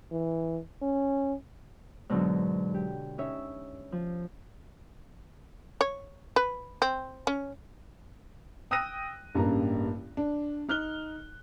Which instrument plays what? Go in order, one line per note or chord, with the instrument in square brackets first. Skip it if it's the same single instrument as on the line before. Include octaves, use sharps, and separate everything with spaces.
[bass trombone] E3
C#4
[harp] G#2 B2 D3 F#3
G4
C#4 D#4 C#5 E5
F3
[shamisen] C#5
B4
C4
C#4
[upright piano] G5 D#6 E6 F#6 A#6 D#7
A1 G2 C#3 A#3 A#5
D4
D#4 F6 F#6 G7